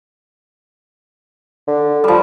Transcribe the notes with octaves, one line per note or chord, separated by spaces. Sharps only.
D3
F3 G3